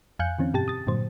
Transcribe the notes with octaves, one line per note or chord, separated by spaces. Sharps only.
F2 F5 G#5 F#6 G6 C#7
D3 E3 C4 C#4
G2 B2 G4 A5 A6
D#6 A6
G2 A#2 D3 F#3 C5